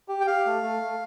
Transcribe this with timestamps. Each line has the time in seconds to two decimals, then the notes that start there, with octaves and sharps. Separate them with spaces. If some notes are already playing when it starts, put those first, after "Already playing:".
0.08 G4
0.21 G5
0.27 G4 F5
0.46 A3
0.63 A3
0.82 A3